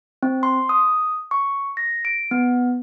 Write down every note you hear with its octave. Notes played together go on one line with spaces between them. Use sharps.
C4
C6
D#6
C#6
A#6
D7
B3